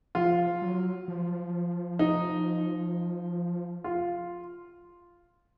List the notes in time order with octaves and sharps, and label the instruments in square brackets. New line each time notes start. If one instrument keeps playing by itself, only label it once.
[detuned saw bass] F3 [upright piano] F4
[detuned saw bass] F#3
F3
[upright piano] D#4
F4